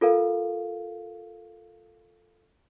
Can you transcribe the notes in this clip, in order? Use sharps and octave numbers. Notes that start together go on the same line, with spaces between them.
F4 A4 A#4 F5